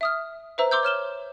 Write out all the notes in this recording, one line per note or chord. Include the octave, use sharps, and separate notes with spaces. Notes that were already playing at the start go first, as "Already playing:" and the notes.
E5 D#6 F6
B4 C5 E5 A#5 E6
C6 D6 E6 G6
C#5 F6 E7 G7